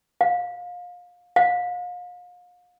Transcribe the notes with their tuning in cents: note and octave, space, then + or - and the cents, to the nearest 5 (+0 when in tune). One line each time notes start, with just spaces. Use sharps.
F5 +25
F5 +35